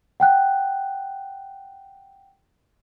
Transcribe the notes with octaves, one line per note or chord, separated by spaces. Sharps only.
F#5 G5 F#6